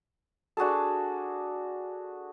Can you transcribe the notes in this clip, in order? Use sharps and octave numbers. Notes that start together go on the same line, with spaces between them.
D4 F#4 G#4 A4